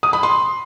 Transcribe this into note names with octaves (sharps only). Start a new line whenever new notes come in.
D#6
B5
C6